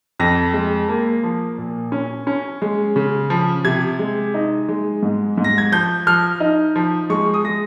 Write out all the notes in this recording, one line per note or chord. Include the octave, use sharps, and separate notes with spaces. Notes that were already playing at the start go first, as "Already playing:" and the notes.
F2 A#6
G#3
A#3
F3
A#2
C#4
C#4
G#3
C#3
F3
C3 G#6
G#3
D#4
G#3
G#2
G#2
A#6
G#6
F3 G6
F3 F6
D#4
F3
G#3 C#6
D#6
G#3 A#6